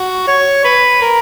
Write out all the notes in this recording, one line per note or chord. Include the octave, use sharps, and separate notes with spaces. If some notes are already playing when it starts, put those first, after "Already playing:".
Already playing: F#4
C#5
B4
A#4